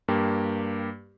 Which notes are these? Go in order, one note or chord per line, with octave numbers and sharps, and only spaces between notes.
G2 A#3 G4